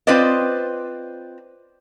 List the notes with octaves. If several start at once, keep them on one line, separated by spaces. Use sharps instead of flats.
C4 F4 B4 C5 D5 D#5